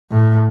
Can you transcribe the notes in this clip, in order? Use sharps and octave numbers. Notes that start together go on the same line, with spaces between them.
A2